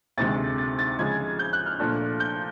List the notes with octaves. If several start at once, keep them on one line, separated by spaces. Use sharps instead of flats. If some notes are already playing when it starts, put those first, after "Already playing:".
D2 C3 D#3 G#3 A6
A6
A6
C#3 F3 G#3 G#6
G6
F#6
F6
A#2 F3 A3 D4
G6